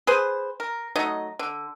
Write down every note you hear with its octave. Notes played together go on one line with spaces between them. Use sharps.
G#4 B4 C5
A#4
F#3 A3 D#4 D#5
D3